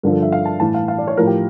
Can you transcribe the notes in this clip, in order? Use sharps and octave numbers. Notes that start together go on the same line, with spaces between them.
G2 D3 F3 A#4
A4
E5
F5
A5
A2 E3 A5
F5
F5
D5
C#5
A2 F3 A#4
G4